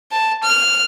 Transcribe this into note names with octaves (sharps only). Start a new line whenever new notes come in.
A5
F6